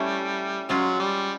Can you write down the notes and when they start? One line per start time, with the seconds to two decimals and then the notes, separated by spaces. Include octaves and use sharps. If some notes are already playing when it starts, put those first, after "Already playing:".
Already playing: G3 A3 C#4 E4
0.69 F#3 G#3 C#4 F4
0.99 G3